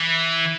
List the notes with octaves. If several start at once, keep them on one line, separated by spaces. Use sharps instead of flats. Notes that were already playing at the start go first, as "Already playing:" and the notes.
Already playing: E3